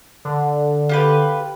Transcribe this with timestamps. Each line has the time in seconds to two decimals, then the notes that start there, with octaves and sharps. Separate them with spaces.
0.25 D3
0.89 F4 G4 B4